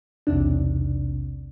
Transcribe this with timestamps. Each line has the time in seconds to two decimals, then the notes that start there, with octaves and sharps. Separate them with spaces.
0.27 B1 E2 C3 D4